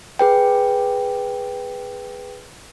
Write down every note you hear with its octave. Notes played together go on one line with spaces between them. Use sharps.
G#4 B4 G5